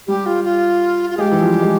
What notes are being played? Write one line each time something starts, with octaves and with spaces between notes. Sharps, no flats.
G3 G4
F4
F4
F4
G#3 G4 G#4
E3
F3
G3
G#3